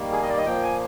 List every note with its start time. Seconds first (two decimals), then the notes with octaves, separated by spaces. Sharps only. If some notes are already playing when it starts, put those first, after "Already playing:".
Already playing: D#3 G3 A#3
0.12 G#4
0.22 D#5
0.29 D5
0.37 D#5
0.45 A#2 F3 A#3 G5
0.63 G#5